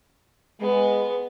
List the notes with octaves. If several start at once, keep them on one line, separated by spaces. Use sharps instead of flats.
G#3 B3